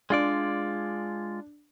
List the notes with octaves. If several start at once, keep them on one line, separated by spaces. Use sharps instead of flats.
G#3 D4 F4 D5